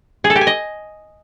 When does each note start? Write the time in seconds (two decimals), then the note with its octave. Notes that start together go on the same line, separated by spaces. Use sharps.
0.24 G#4
0.30 A4
0.36 G4
0.41 G#5
0.47 D#5